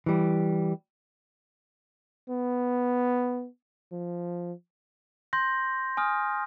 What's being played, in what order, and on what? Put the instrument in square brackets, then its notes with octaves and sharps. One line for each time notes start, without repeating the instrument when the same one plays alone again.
[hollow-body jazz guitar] E3 G3
[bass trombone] B3
F3
[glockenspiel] C6 G6 A#6
G#5 D#6 F6